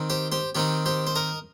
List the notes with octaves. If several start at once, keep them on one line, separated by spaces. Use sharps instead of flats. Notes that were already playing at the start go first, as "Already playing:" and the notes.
Already playing: D#3 C4 D#4
G4 C5
G4 C5
D#3 C4 D#4 G4
G4 C5
C5
A#4 D#5